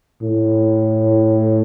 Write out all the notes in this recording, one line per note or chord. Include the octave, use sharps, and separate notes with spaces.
A2